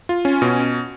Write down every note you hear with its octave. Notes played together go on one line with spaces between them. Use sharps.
F4
C#4
B2